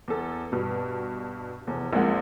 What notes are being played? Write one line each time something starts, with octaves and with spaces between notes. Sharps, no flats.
E2 A4
G2 B2
F1 E2
A#1 F2 A#2 G#3 F#5